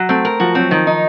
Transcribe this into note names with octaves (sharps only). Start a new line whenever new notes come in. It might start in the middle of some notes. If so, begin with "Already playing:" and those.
Already playing: F#3
A3 C4
A#4
F3 F#4
F#3 C4
D#3 F3
D#4